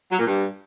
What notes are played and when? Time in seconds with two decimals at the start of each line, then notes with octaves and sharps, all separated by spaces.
0.11 F#3
0.18 A#2
0.26 G2